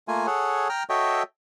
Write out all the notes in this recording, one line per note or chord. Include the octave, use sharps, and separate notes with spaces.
A3 A#3 F4 G#5
G#4 A4 C#5 F#5
G5 A#5 F6
F#4 A4 C#5 D#5 E5 G5